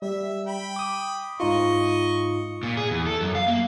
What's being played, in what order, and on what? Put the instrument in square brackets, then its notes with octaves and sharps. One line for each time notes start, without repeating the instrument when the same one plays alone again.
[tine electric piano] G3 [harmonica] E5
[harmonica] G5 B5
[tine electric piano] D6 D#6
[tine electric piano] G#2 D#4 F4 [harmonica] D#5 C#6
[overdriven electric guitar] A#2
G#4
E2
A4
F#2
F5
A#3